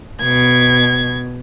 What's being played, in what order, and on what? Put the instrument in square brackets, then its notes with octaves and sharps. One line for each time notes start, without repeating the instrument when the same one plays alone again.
[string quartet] B2 G#6